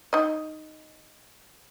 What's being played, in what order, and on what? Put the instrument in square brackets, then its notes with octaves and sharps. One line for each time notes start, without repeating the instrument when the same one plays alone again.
[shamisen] D#4 D#5